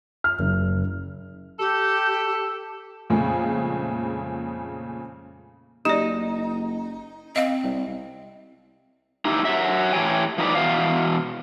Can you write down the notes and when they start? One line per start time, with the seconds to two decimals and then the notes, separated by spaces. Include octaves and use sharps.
0.24 F6
0.39 F#1
1.59 G4 A4
3.10 F2 A#2 C#3 G#3 A3
5.85 F#1 D#4 G4 D5
7.36 C4 D#5 F5
7.64 C2
9.25 D#4 E4 G4
9.45 F#3 E5
9.93 A2 E3 G4 C#5 G5 G#5
10.38 F3 D#4 B4 D5
10.55 B2 E3 F5